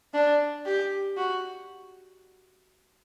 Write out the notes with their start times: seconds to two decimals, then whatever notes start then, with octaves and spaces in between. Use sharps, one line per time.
0.14 D4
0.66 G4
1.17 F#4